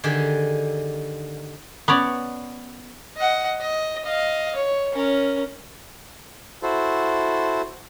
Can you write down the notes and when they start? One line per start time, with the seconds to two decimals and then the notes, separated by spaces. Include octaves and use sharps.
0.04 D3 D#3 G4 G#4
1.88 B3 C#4 C#5 D5
3.16 D#5 F#5
3.61 D#5
4.05 D#5 F5
4.55 C#5
4.93 C#4 A#4
6.63 E4 F#4 A4 C5